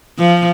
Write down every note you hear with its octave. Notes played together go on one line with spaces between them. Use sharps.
F3